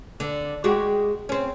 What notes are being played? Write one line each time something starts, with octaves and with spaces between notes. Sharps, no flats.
D3
G#3 F#4 G4
C4 C#4